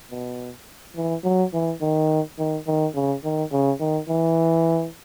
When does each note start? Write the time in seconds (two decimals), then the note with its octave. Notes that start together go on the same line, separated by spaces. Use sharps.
0.10 B2
0.96 E3
1.24 F#3
1.53 E3
1.81 D#3
2.39 D#3
2.67 D#3
2.95 C#3
3.24 D#3
3.52 C#3
3.80 D#3
4.08 E3